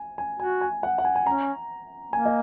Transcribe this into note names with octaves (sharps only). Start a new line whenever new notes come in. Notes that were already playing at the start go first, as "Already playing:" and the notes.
Already playing: G#5
G#5
F#4 G#5
G#5
F#5
F#5
G#5
G#5
C#4 A#5
A#3 G#5
D#5